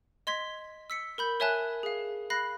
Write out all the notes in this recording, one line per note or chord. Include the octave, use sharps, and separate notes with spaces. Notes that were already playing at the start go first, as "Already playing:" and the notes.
D#5 C6 G#6 B6
E6 B6 C#7
A#4 B5 G6
A#4 C#5 E5 G#5 A5 F#6
G#4 F5
F5 B5 F#6 A#6 C7